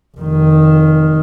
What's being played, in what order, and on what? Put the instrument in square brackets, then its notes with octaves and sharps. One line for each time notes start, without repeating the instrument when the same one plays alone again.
[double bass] F1 D#3